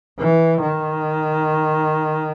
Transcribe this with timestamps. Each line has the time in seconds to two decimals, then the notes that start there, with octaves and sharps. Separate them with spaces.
0.19 E3
0.61 D#3